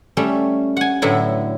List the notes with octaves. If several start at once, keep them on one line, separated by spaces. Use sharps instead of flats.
G3 A3 C#4
F#5 G#5
A2 D3 F#3 E4 B4